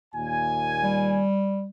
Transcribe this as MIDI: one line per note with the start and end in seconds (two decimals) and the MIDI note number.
0.14 1.27 39
0.14 1.27 46
0.14 1.27 80
0.84 1.69 55